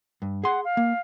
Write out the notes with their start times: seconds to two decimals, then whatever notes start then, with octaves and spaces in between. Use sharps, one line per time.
0.22 G2
0.44 G#4 F#5 C6
0.64 F5
0.77 A#3